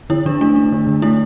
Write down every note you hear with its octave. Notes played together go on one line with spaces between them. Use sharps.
D3 E4
D3 D4
A3 D4
D4
D3
D3
A3 E4